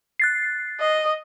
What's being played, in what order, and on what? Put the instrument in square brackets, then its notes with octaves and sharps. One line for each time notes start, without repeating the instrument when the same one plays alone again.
[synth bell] F#6 A6 C7
[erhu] D#5